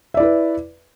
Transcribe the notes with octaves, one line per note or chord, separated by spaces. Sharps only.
E4 B4 D5 E5